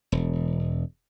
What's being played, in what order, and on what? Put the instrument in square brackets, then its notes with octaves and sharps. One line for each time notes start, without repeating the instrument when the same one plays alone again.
[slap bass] E1